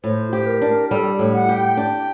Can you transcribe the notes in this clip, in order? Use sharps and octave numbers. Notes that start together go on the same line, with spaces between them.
A2 C5
G4
A#4
D4
G3 A4
A2
F#5
G4
G5
D4